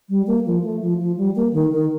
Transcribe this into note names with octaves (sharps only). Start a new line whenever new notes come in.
G3
A#3
F3
A3
F3
F3
G3
A#3
D#3
D#3